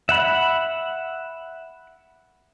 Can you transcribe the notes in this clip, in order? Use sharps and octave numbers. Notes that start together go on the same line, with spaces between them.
E5 F#5 B5